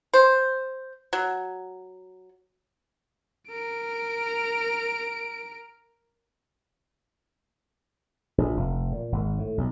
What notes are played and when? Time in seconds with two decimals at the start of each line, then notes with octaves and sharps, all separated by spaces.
0.14 C5
1.13 F#3
3.49 A#4 D7
8.38 A#1
8.57 F1
8.92 A#2
9.12 G#1
9.39 A2
9.58 B1